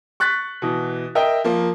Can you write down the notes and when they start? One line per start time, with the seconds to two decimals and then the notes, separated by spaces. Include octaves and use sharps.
0.20 C#6 F#6 A6 B6
0.62 B2 E3
1.15 A#4 D#5 E5 G5
1.44 F3 A#3